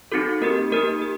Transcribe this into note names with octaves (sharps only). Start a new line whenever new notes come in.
C4 D#4 F#4 A4
A#3 D#4 G4 A#4
A#3 D#4 G4 A#4
G4